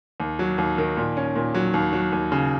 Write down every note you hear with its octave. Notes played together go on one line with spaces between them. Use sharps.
D#2
F#3
D#2
D#3
A#2
C#4
A#2
F#3
D#2
F#3
D#2
C#3